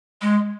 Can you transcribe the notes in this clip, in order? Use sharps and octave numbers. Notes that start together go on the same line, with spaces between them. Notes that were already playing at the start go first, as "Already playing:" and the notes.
G#3